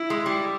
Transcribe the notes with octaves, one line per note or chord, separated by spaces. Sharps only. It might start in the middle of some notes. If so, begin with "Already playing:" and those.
Already playing: E4
G#3
G3